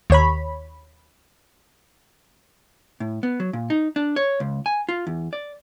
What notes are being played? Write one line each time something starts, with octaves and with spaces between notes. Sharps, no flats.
D#2 C#5 B5
A2
B3
F#3
A#2
D#4
D4
C#5
C#2
G#5
F4
E2
D5